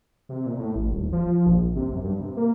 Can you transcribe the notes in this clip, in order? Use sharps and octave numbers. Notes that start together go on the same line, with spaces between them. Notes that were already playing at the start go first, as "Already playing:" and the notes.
C3
A#2
A2
A1
D#1
F3
A#1
C3
F#2
G2
C3
A#3